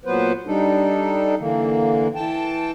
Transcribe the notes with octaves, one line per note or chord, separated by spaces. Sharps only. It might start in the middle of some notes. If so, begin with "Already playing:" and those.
A#2 F#3 B3 B4 C5
G3 D4 D#4 A4
D3 E3 A#3
E3 G5 A5